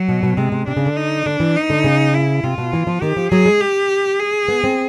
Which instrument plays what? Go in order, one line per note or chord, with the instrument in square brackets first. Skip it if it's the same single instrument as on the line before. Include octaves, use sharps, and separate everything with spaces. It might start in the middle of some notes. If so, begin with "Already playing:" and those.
Already playing: [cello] F#3
[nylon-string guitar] B2
B2
[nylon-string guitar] C3 [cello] G#3
[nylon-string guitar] C3
[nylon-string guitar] C3 [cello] D4
[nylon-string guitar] C#3
D3
[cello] D#4
[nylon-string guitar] D3 [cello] D4
[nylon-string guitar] E3
[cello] D#4
[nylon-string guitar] D3
C#3
[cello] E4
[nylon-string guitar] C3 [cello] F4
[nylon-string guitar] B2
E3
F3
[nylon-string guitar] D#3 [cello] G4
[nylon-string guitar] F3
[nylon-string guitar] F#3 [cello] G#4
[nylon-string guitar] G#3
[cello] G4
G#4
[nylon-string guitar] B3
C4